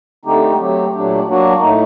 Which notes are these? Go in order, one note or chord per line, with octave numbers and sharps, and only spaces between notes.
D3 A3 C4 D#4 G4
F#3 A3 C4 G4
A#2 F#3 A3 D4 G4
F#3 A#3 D4 F#4
A2 A3 D#4